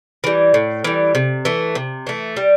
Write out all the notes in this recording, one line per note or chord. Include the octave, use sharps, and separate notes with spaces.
E3 G3
A2
E3 G3
C3
E3 A3
C3
E3 A3
G3